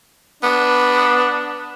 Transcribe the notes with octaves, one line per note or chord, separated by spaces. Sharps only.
B3 D4